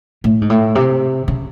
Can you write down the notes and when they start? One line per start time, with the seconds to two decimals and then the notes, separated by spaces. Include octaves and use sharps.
0.24 A2
0.41 G#2
0.50 A2
0.75 C3
1.28 C#3